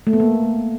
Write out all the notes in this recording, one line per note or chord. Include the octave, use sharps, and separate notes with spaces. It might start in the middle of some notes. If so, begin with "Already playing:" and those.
A3
B3
A#3